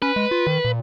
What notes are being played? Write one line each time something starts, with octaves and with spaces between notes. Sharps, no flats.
C#4 B4
G#3
F4
D#3
A#2